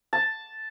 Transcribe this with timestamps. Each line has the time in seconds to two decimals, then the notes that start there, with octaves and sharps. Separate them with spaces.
0.13 A5